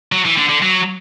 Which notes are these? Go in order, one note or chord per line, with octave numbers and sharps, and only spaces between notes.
F#3
E3
D3
D3
F#3